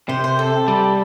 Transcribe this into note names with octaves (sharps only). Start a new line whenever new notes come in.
C3 C5
C5
A4
G3